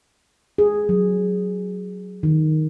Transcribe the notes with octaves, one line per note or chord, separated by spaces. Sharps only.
G#4
F#3
D#3